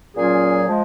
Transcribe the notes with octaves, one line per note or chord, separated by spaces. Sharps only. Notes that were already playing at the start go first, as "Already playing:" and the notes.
A#2 F#3 C#4 F4 G#4
F3 G#3